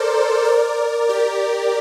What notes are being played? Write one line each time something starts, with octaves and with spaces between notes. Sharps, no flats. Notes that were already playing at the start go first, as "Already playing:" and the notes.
Already playing: A4 A#4 C5 D5
A#4 D5
G4 A#4